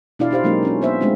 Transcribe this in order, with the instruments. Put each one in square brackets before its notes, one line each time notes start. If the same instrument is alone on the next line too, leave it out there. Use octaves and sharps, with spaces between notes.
[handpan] B2 D4 E4 F4 D5 F5
D#4 F4 G4 C5 F5
F#3 G#3 A#3 C#4 D#4 G4
C4 C#4 F4
B3 C5 E5
G#3 A3 C4 D4 D#4 F4